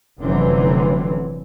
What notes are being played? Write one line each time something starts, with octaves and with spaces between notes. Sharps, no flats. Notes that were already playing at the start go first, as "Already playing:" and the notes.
F1 F#2 D3 E3 F#3 C4